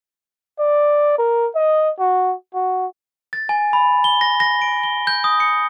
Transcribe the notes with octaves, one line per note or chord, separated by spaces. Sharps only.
D5
A#4
D#5
F#4
F#4
A6
G#5
B5
G7
A#6
A#6
D7
G7
G6
D#6
C#7